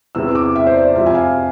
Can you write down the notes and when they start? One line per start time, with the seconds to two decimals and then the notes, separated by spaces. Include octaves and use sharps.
0.15 E2 C3 E3 E6
0.35 D6
0.55 E5
0.66 C5
0.76 D5
0.95 F2 C3 F3 E5
1.06 G#5
1.15 F5